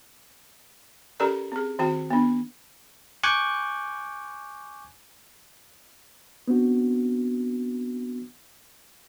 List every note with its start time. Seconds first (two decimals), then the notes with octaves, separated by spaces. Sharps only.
1.20 C#4 G4 A4 A#4 D5 A#5
1.52 C4 G#4
1.79 D#3 C4 F#4 G5
2.10 B3 D4
3.23 G#5 C#6 D6 F#6 G6
6.48 B3 C4 D4 F#4